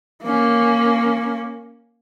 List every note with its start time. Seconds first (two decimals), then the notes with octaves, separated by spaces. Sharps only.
0.24 A#3 C#4